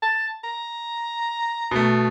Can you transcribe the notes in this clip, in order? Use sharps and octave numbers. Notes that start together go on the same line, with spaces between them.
A5
A#5
B2 A3